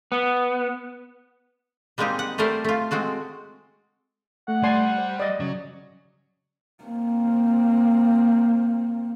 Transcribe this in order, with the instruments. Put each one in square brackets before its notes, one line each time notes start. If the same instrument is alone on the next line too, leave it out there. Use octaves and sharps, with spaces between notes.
[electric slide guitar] B3
[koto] G3 G#3 A#3 C4 D#4 G4
F#5
G3 A3 A4 A#4 C5 D5
A3 F4
G#3 C4 F#4 A4
[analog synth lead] A3 [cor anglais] F#5
[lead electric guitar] G3 [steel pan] D5 G#5 C6
[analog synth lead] C5
[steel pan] D5 D#5 [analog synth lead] D#6
[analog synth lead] C#3 [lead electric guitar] F#3
[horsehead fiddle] A#3 C4